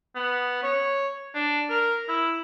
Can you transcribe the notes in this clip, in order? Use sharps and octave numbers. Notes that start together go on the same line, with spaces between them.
B3
C#5
D4
A#4
E4